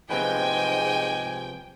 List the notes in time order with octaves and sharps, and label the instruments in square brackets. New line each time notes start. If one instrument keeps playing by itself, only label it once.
[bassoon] G#2 [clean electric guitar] C3 F3 B4 [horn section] G#3 G4 G#5 [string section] G5